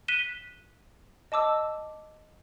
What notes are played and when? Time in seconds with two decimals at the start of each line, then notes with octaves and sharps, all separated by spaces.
0.08 F#6 B6 D#7 E7 G7
1.32 D#5 A5 D6 E6